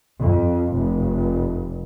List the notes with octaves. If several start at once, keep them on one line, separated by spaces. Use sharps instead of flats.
F2
F1